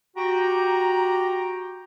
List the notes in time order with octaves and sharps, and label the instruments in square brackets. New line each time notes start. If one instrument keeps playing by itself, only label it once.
[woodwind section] F#4 G4 G5 A#5